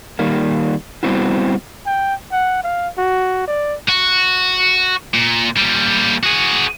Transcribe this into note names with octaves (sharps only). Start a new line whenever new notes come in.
D#3 G3 A#3
G3 B3 C4 E4 F#4
G5
F#5
F5
F#4
D5
F#4
A#2
A#2 G3
F#4 G#4